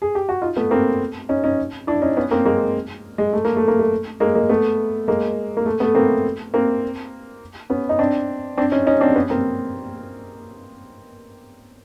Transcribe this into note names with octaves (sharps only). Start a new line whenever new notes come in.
G#4
G4
F#4
D#4 F4
A3 B3
A#3 C4
C#4 D#4
C#4 D#4
D4 E4
C#4 D#4
B3 C#4
A#3 C4
G#3 A#3
G#3
A3
A#3
A3
A#3
A3
G#3 A#3
G#3 A#3
A3 B3
G#3 A#3
A#3
A3
A3 B3
A#3 C4
A#3 C4
B3 C#4
D#4
C4 D4
C4 D4
C#4 D#4
C#4 D#4
C4 D4
B3 C#4
A#3 C4